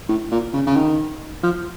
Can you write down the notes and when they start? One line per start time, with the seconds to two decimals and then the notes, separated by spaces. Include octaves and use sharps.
0.09 A2
0.31 A#2
0.53 C#3
0.66 C#3
0.76 D#3
1.43 F3